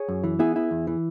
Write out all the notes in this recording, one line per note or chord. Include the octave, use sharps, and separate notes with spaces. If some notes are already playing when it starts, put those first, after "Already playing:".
Already playing: G#4 C#5
F#2
E3
B3 E4 G#4
E4
E2
E3